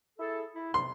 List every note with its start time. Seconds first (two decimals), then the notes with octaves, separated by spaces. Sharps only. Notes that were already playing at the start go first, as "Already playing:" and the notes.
0.19 E4 G#4 A4
0.55 E4
0.74 C3 C6